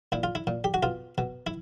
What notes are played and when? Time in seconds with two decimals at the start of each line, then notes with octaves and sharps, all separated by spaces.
0.12 A#2 E4
0.23 F4
0.35 E4
0.47 A#2
0.64 G4
0.74 F#4
0.83 B2 F4
1.18 B2
1.47 E4